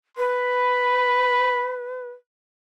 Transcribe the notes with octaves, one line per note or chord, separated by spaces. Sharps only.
B4 B5